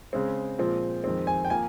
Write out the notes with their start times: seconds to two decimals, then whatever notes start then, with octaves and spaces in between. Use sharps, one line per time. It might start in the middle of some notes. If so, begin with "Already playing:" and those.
0.13 C#3 G#3 C4
0.59 A#2 F3 G#3 C4
1.04 F2 D#3 G#3 C4
1.27 G#5
1.45 G5
1.50 F3 A#3 G#5